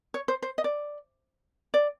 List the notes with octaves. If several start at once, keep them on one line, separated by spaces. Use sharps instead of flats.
C#5
C5
C5
D#5
D5
D5